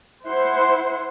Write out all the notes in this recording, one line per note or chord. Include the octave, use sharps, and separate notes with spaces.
E4 C5 F#5 C6